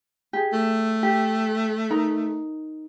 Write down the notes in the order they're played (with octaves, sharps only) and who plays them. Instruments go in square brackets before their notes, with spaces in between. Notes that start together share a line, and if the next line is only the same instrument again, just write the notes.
[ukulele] G4 G#4
[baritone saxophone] A3
[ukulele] G4
D#4 A#4 A#5